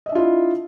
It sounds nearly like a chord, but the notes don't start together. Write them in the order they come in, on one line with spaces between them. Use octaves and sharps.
D#5 E5 D4 F4 E4